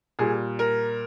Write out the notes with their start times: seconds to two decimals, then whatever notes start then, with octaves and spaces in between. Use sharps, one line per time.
0.19 A#2 G3 G#4
0.59 A#4